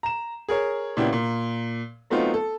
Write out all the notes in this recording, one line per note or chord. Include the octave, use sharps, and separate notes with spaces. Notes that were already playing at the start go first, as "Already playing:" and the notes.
A#5 E7
G#4 A#4 C#5
A#2 C#3 B3 D4 E4 G4
A#2
F#3 A3 B3 C4 D#4 F4
A4